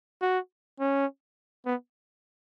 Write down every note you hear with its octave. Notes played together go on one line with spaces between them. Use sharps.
F#4
C#4
B3